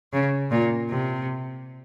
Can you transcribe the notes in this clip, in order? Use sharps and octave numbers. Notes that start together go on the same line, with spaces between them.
C#3
A#2
C3